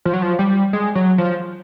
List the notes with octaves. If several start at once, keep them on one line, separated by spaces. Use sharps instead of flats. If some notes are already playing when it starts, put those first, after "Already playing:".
F3
F#3
F3
G3
G#3
F#3
F3